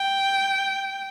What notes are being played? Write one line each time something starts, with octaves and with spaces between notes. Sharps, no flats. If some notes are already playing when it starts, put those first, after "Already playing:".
Already playing: G5